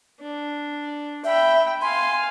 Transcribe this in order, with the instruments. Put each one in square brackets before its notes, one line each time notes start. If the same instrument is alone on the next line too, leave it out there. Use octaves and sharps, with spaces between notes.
[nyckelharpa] D4
[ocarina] E5 [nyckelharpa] G5 B5
[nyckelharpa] F5 G#5 [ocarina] C6